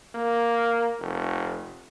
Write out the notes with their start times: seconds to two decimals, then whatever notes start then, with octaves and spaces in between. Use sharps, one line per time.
0.15 A#3
0.99 F1